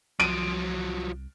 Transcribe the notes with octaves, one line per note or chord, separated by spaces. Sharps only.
C2 F3 F#3 D7 D#7